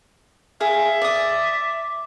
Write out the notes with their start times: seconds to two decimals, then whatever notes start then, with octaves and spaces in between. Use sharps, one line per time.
0.60 G#4 C#5 E5 F5
1.02 D5 D#6